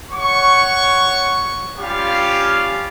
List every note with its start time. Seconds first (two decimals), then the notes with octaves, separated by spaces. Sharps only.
0.12 C#5 F#5 C#6
1.80 G3 C#4 F4 G4 F5